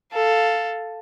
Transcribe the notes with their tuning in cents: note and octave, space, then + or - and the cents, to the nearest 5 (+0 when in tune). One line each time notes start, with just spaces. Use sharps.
A4 +5 F5 +0